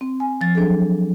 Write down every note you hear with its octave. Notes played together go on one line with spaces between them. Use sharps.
C4
G#5
F3 A6
F#3 D4 G#4 A4